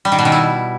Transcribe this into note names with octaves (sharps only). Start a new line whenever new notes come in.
G3
D#3
B2
D#3
E4